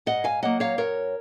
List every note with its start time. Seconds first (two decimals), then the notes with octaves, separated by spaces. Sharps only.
0.06 G#2 D#5 F#5
0.24 F5 G#5
0.42 F#3 A#3 D#5 F#5
0.60 C#5 F5
0.78 F#2 A#4 C#5